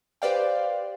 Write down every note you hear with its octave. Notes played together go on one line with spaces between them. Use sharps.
G4 B4 C5 D5 F5 G5